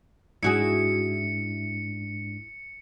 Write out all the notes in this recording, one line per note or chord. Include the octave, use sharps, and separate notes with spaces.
G#2 G#3 D4 E4 F#4 G#4 C#7